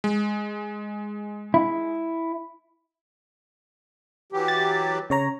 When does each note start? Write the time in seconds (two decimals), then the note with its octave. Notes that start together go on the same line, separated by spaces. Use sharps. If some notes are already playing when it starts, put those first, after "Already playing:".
0.04 G#3
1.54 E4
4.33 E3 F#3 G4
4.48 A6
5.10 C#3 C#5 A#5